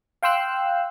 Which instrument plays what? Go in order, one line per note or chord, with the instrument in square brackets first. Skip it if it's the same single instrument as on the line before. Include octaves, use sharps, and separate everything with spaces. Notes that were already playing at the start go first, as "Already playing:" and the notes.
[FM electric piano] F5 G5 C6 E6 F#6